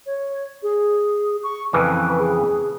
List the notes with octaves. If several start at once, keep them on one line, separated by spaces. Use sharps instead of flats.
C#5
G#4
C#6
F2 C#3 E3 B4
G#4